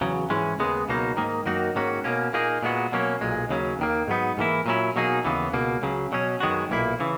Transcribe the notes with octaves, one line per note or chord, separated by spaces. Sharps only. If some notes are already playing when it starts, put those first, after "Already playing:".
E2 C#3 F#3
G#2 E3 G#3 C#4
D#2 C#3 G#3 B3
C#2 B2 F#3 A#3 D#4
G#2 D#3 A#3 D#4
F#2 D#3 A#3 D#4 F#4
G#2 D#3 A#3 C#4 F#4
B2 A#3 C#4
A#2 A#3 D#4 G#4
A#2 G#3 B3 F#4
B2 F#3 A#3 C#4
B1 A#2 G#3
D#2 C#3 F#3 C#4
D#2 D#3 A#3
G#2 F#3 B3 D#4
G#2 E3 A#3 E4
A#2 F#3 C#4 E4
B2 F#3 A#3 D#4 G#4
D#2 C#3 E3 B3
C#2 B2 A#3
C#2 C#3 F#3
B2 F#3 C#4
F#2 D#3 G#3 B3 F#4
B1 A#2 A#3 E4
C#3 E3